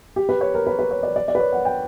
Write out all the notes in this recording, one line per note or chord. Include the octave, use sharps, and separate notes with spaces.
G4
B4
C#5
A#4
B4
B4
C#5
D5
D5
D5
B4
C#5
F#5
G5